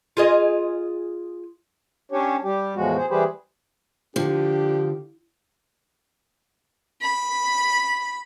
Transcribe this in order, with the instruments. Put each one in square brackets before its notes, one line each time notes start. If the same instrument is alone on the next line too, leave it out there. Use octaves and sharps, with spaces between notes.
[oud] F4 G#4 D#5
[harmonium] C#4 D4 G4 C#5
G3 G4
E2 A2 F3 G#3 F#4
G#4 C5
E3 G3 G4 G#4 B4 C5
[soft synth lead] D3 [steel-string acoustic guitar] F3 [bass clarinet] D4 [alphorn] G4
[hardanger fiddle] B5